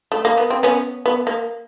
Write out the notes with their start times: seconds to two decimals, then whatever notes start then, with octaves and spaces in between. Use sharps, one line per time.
0.12 A3
0.25 A#3
0.38 B3
0.50 C4
0.63 B3 C#4
1.06 B3
1.27 A#3